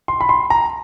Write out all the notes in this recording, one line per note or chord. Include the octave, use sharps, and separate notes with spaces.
C6
B5
C6
A#5